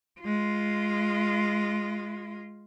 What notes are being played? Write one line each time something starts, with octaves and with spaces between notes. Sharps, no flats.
G#3 F4